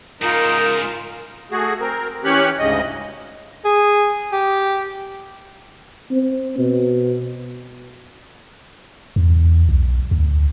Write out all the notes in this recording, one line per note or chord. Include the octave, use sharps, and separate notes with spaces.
G#2 C#3 D#4 F4 A#4
A3 F#4 G#4
C4 A#4
E3 C#4 G4 C#5 F#6
D2 G#2 C#3 D#5
G#4
G4
C4
B2
E2
B1
D2